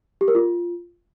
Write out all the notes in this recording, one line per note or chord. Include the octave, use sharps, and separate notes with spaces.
G4
A#4
F4